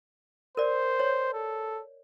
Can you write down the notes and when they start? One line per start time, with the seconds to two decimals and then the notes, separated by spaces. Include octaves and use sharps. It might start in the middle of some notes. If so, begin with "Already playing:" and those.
0.57 A#4 C5 D5
1.00 C#5
1.33 A4